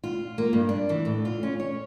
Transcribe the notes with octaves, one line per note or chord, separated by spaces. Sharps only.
F4
A#3
G2
D4
E3
A2
F4
C#4
C#5